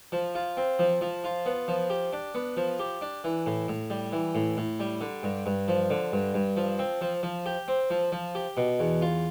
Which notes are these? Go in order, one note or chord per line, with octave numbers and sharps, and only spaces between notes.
F3
F4
C4
F3
F3
F4
B3
F3
G4
D4
B3
F3
G4
D4
E3
A2
A2
G3
E3
A2
A2
G3
D3
G2
G2
F3
D3
G2
G2
F3
C4
F3
F3
G4
C4
F3
F3
G4
B2
E2
F4